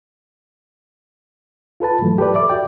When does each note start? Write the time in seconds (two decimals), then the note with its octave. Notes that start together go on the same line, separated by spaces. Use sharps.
1.80 F4 A4 B4 A5
2.01 G#2 E3 F#3 A3
2.18 G4 A4 B4 D5
2.35 D5 E5 D6
2.49 F#4 D5 G5